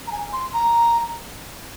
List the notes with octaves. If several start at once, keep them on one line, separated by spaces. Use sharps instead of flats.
A#5
G#5
C6
A#5